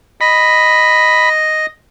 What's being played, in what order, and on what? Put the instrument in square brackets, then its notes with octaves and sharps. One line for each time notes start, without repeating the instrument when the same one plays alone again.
[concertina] D#5 [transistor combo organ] B5